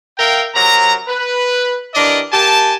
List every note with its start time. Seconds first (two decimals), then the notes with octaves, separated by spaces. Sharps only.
0.18 A#4 E5 F5 G5
0.55 C3 F#3 A#4 A#5
1.08 B4
1.95 E3 D4 G4 A#4 D5 D#5
2.32 A#3 G4 G#5 A5